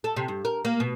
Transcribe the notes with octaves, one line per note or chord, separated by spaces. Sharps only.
A4
C3
G2
A#4
A#3
B2